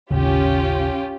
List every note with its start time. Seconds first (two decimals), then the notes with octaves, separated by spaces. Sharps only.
0.11 A1 D#2 C#3 C#4 F4 G4